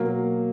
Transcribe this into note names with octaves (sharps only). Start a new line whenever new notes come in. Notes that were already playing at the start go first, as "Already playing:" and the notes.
Already playing: B2 F#3 A#3